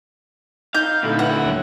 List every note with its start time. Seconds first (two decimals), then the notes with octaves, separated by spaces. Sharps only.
0.74 D#4 F5 G6
1.03 D2 A#2 E4 A4 F5
1.19 B4 F#5
1.45 D#2 F#3 G3 C#5